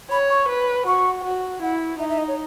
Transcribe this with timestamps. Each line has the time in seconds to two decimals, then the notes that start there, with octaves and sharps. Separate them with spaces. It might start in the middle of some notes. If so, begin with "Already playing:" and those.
0.11 C#5 B5
0.30 C#6
0.49 B4
0.87 F#4 C#6
1.25 F#4
1.62 E4 F#5
1.99 D#4 E5
2.10 E5
2.18 D#5
2.28 C#5